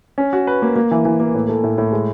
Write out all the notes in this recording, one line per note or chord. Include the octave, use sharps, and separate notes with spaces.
C#4
F#4
B4
A#3
A#3
E3
E3
A#3
A2
A3
A2
A2
G#3